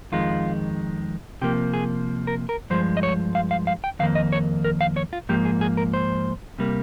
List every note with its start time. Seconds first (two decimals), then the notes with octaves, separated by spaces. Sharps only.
0.12 F2 D#3 G#3 F4
1.41 C3 F3 A#3 G4
1.74 G#4
2.27 A#4
2.49 A#4
2.70 G2 F3 G#3 C5
2.97 D#5
3.03 C#5
3.35 F5
3.51 F5
3.67 F5
3.84 G5
3.99 F2 D#3 A#3 F5
4.15 D#5
4.33 C#5
4.64 A#4
4.81 F5
4.97 C#5
5.13 F4
5.29 G#2 F3 A#3 G4
5.45 G#4
5.61 G#4
5.77 A#4
5.94 C5
6.59 C3 G3 A#3